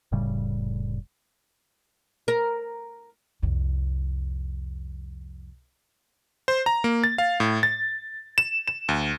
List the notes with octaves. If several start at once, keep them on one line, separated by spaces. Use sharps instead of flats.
F1 A2 C#3 G3
A#4
C2 F2
C5
A#5
A#3
A6
F5
A2
A6
E7
E7
D2